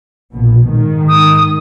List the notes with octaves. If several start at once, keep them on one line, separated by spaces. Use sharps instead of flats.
A#1 B2
G#2 D#3
D#6